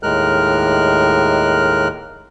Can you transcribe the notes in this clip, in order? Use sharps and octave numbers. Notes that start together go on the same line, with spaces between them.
D#2 A2 G#3 A#4 F6 F#6